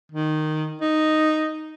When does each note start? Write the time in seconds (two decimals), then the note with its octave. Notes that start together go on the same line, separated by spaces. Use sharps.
0.12 D#3
0.81 D#4